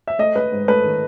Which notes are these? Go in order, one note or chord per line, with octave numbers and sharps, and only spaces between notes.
E5
A3 D#5
A3 B4
G#2
A3 B4
D#3